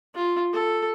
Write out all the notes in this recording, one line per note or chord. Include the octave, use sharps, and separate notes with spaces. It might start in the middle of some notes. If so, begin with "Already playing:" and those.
F4
A4